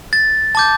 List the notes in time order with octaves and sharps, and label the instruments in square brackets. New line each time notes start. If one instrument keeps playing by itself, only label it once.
[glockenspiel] A6
A5 D6 G6